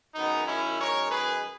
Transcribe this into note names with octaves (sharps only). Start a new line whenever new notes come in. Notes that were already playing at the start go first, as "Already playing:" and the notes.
F#2 D#3 G#3 B3 D#4
C#4 E4
A#4 C#5
G#4 B4